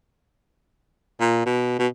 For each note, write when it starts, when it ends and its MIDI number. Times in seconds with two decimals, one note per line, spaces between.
1.21 1.43 46
1.46 1.76 47
1.79 1.87 47